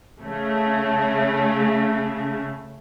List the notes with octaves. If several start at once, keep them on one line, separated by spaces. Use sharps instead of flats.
C#3 A3